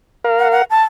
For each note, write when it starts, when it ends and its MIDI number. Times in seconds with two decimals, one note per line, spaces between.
0.24 0.62 70
0.24 0.62 77
0.39 0.48 78
0.52 0.64 78
0.70 0.83 81